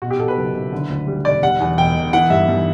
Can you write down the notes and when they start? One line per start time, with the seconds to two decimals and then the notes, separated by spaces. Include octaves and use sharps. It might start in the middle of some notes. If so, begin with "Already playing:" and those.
0.02 B2 F#4
0.11 G4
0.19 B2 A4
0.28 B4
0.37 F#1
0.55 F#1
0.72 D3
0.90 D2
1.07 G3
1.25 E1 D5
1.42 G3 F#5
1.60 E2
1.78 E1 G5
1.95 E1
2.13 E3 F#5
2.30 G2 E5
2.48 G2